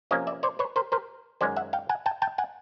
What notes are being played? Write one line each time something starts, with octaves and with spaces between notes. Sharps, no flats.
C3 F3 A#3 C#4 C#5 D#5
D5 E5
C5 D5
B4 C#5
A#4 C5
A#4 C5
F#2 D#3 G#3 C#4 C5 D5
E5 F#5
F5 G5
F#5 G#5
G5 A5
G5 A5
F#5 G#5